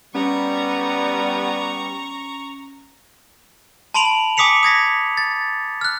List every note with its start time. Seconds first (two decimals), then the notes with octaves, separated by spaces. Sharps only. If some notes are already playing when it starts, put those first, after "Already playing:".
0.15 G3 B3 C#4 A#5 C#6
3.94 A5 B5 C6 D7 F7 F#7
4.37 G#5 D6 D#6 B6 C#7 F7
4.63 D#6 G#6 A#6 B6
5.17 A6
5.81 F6 F#6